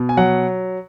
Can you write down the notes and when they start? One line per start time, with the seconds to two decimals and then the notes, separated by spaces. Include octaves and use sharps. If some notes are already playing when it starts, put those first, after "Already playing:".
Already playing: B2
0.09 G#5
0.17 F#3 F#5